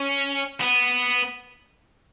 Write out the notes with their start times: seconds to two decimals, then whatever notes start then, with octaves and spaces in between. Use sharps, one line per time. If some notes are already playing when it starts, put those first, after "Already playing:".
Already playing: C#4
0.61 B3